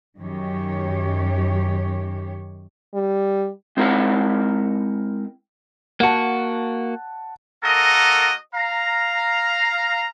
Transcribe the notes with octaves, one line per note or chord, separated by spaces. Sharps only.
F#2 D#3 G4 C#5
G3
G#3 C4 E4 A#4 D#5 F#5
A#3 F#4 F#5 A5
A#3 F#4 A4 A#4 D#5
F5 A#5